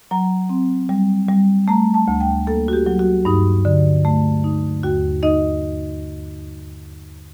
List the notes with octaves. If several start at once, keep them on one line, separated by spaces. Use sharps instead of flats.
F#3 A#5
C4
G3
G3
A3 A#5
A5
D2
G5
A#3 A4
F#4
G4
F#3
F#4
G2 D#4
D3
A3
D#4
D#2 F#4
D#4 D#5